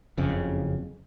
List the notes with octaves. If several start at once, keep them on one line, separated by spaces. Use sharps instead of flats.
F#1 F2 C#3